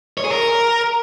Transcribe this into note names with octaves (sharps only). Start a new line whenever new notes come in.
C#5
G#4
A#4